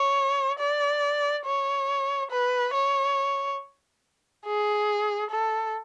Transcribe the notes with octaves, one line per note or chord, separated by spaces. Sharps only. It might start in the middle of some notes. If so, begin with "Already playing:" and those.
Already playing: C#5
D5
C#5
B4
C#5
G#4
A4